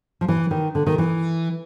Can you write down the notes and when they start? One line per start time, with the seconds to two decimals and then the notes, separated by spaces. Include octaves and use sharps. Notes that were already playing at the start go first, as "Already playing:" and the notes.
0.21 F3
0.28 E3
0.51 D#3
0.75 D3
0.87 D#3
0.98 E3